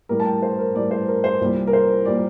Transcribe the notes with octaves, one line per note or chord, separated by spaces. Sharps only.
A2 G3 A#4
A5
G5
C5
A#4
A2 G3 D5
C5
A#4
C5
C2 A#2 G3
A#4
C5
A#2 G3 D5